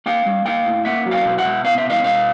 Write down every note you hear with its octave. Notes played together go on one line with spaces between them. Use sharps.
A#3 F5 G5
G3
A#3 F5 G5
A2
A#3 E5 F#5
F#3
F5 G5
B2
E5 F#5
B2
B3 F5
E5
B2 D#5 F5
B2 D#5 F5